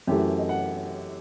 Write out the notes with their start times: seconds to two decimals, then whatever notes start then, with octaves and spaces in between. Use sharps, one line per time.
0.07 F#2 E3 A3 G4
0.18 F#4
0.39 D#5
0.49 F#5